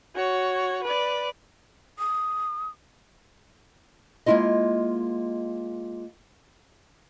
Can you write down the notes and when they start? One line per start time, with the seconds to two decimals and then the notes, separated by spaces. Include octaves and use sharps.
0.16 F#4 C#5
0.83 B4 D5
1.99 D#6
4.26 G#3 A#3 C#4 E4 F4 D#5